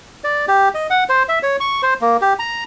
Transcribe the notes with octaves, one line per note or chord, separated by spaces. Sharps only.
D5
G4
D#5
F#5
C5
E5
C#5
C#6
C5
A#3
G4
A#5